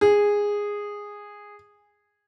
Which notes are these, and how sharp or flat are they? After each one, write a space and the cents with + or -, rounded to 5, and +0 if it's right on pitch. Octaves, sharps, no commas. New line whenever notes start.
G#4 -10